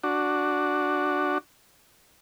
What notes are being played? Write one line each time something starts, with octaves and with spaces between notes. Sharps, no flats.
D4 F#4